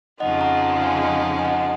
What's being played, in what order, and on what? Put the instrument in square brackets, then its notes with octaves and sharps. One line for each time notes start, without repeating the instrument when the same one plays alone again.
[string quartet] F2 C#3 F3 G#3 D#4 [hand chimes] D#5 F#5
[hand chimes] F#5 A#5
F#5 A#5
F5 G#5
D#5 F#5
G#5
D#5 F#5